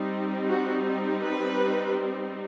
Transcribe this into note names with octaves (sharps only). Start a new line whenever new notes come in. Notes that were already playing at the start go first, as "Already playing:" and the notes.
Already playing: G3 C4 D#4
F#4
B4